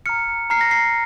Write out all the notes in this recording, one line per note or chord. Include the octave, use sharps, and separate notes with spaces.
A#5 F6 C#7
A#5 F6 C7
A#6
C7